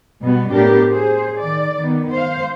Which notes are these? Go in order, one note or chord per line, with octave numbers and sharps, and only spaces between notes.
B2 G3 B3
A2 B3 D4 G4 A#4
G#4 C5
D#3 D5
D#3 B3
C5 F5